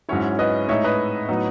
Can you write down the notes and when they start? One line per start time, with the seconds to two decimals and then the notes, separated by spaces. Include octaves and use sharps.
0.09 G#2 F#3 C#4 E4 C#5
0.39 B4 D#5
0.68 A2 G#3 D#4 C#5 E5
0.84 B4 D#5
1.29 A2 F#3 B3 D#4